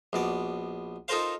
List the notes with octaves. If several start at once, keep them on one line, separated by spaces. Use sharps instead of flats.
A#1 B2 D5
D#4 F4 A4 A#4 C5 F5